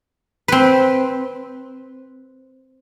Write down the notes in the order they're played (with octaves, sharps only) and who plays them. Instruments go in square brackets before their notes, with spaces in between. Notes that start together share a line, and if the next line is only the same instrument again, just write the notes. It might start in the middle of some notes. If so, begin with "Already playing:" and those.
[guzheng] C4 B4